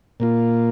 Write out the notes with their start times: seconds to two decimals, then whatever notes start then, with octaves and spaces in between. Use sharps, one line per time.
0.20 A#2 A#3 F4